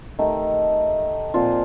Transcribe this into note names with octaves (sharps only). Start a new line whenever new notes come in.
D#3 A3 D#4 G4
A#2 F3 C4 F4